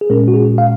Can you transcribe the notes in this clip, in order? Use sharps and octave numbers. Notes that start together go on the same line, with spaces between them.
G#4
A#2 G#3 C#4 A#4
F#4
G#4
F5